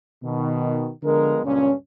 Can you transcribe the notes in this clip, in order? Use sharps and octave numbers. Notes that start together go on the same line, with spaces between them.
B2 D#3
D3 F3 G#3 B3 A#4
C#2 G2 A#2 C#4